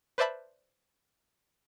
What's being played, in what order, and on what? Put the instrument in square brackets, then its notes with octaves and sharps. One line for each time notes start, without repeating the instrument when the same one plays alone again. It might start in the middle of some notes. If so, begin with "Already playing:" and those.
[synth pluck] B4 C5 D5 E5 A5 B5